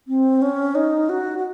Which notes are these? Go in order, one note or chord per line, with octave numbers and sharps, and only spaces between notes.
C4
C#4
D#4
F#4
F#4